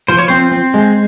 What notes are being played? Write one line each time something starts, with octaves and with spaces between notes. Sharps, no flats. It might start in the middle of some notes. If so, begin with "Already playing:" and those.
F3 C5
C#5
C4 C5
C4
G#3